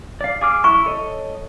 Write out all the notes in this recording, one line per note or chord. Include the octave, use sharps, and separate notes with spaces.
D5 F5
G#4 D6 F6
E4 C#6
A4 C#5 D#5